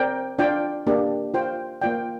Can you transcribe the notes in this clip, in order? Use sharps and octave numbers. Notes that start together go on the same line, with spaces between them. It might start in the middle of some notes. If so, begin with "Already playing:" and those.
Already playing: C4 A#4 D5 G5
D4 F4 D5 G5
A#3 D4 G4
F4 C5 G5
A#3 F4 D5 G5